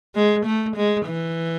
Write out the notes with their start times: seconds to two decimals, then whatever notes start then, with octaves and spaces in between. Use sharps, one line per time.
0.15 G#3
0.45 A3
0.76 G#3
1.06 E3